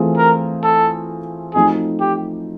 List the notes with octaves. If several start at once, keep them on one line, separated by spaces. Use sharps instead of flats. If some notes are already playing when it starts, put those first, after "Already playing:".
Already playing: E3 A3 C4 F4 G#4
A#4
A4
F3 A3 C4 D#4 F#4 G#4
G4